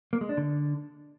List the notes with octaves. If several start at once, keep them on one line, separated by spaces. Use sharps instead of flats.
A#3
G#3
D4
D3